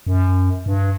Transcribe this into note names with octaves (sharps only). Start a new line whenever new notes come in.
F#2
G2